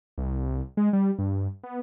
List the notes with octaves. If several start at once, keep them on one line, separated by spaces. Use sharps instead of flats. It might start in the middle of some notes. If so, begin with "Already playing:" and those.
C2
G#3
G3
G2
B3